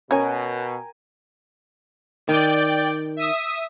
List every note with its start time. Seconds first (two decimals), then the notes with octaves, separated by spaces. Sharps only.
0.11 B2 C#4 A#4 C#5 G5 G#5
2.29 D#3 D5 G5
3.17 E5 D#6